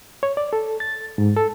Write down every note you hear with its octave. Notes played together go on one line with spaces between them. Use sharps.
C#5
D5
A4
A6
G#2
A4